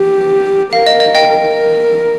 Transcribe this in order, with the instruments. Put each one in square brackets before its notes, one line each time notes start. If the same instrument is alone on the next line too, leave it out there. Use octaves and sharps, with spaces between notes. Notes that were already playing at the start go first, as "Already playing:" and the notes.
Already playing: [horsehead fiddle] G4
[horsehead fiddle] A#4 [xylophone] F5
[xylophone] D#5
D#5
D#5 G5
[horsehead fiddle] A#4